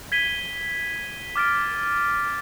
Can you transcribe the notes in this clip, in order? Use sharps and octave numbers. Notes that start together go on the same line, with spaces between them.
G#6 B6 D#7 G7
D6 F6 A6 D7